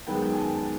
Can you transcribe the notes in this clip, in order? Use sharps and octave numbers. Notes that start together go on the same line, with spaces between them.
F#2 D#3 G#3 B3 G5
G5
G#5
A5
A5